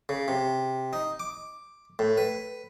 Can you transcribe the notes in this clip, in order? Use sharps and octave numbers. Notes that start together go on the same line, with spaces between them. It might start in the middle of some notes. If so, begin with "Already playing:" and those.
C#3
C3
D#4
D6
A2
B4